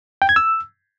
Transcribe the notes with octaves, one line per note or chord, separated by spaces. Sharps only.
G5
G#6
E6